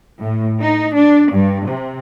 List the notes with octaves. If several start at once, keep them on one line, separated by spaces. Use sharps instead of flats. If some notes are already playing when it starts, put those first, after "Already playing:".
A2
D#4
D4
G2
C3